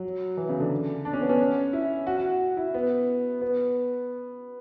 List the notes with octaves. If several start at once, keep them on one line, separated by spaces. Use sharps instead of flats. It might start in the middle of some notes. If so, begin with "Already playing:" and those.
Already playing: F#3
E3
C#3
D3
D4
C#4
B3
C#4
E4
F#4
F#4
E4
B3
B3